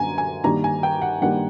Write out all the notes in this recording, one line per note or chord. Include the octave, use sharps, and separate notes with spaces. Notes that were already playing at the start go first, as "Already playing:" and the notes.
Already playing: F#2 D3 G3 A#3 G#5 A#5
G#5
G2 D#3 G3 A#3 A#5
G#5
G5
F#5
G2 D#3 G3 A#3 F#5